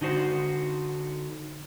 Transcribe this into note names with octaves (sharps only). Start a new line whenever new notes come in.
D3 D#4 F#4 C5